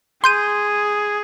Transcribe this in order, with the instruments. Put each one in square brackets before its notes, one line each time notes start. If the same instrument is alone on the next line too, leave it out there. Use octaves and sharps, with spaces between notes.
[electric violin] G#4 [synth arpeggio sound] C6 G6 D#7